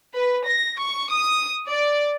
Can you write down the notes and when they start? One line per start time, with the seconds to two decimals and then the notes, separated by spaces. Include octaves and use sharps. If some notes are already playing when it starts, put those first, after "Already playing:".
0.14 B4
0.46 A#6
0.78 C#6
1.12 D#6
1.67 D5